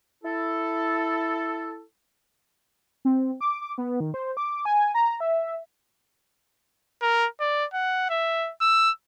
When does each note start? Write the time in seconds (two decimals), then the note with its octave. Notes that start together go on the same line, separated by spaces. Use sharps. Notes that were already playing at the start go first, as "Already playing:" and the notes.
0.24 E4 A4
3.05 C4
3.41 D6
3.61 D6
3.78 B3
4.00 D#3
4.14 C5
4.37 D6
4.65 G#5
4.95 A#5
5.20 E5
7.02 A#4
7.40 D5
7.74 F#5
8.10 E5
8.61 E6